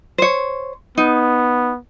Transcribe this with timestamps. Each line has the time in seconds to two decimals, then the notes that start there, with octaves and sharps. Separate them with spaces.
0.18 C5 C#5
0.97 B3 D#4